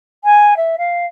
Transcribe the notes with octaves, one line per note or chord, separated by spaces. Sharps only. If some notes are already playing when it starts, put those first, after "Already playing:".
G#5
E5
F5